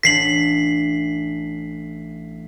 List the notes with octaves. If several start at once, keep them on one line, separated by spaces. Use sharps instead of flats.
A1 D4 B6 C7 F#7